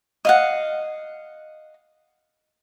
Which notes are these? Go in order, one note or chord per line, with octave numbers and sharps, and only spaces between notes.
D#5 F5 F#5